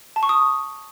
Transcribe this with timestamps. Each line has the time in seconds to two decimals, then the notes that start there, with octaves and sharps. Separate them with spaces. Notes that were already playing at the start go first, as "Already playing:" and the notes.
0.16 A5
0.23 C#6
0.29 D#6